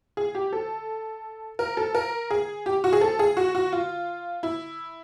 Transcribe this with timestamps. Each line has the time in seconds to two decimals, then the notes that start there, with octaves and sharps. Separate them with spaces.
0.17 G#4
0.35 G4
0.53 A4
1.59 A#4
1.77 A4
1.95 A#4
2.31 G#4
2.66 G4
2.84 F#4
2.93 G#4
3.01 A4
3.19 G#4
3.37 F#4
3.55 F#4
3.73 F4
4.43 E4